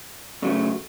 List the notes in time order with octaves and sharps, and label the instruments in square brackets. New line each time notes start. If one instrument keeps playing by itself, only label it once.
[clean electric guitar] C#3 F#3 A3